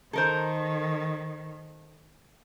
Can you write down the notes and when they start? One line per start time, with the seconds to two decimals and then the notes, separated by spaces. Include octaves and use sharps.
0.13 D#3 A4 A#4 C5